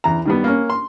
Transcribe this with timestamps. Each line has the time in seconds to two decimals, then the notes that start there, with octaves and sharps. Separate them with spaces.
0.04 E2 A#5
0.25 D#3 G3 B3
0.44 A#3 C#4
0.70 C6